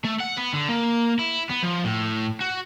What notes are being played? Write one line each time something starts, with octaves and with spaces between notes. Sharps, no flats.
A3
F#5
B3
D3
A#3
E4
B3
F3
A2
F#4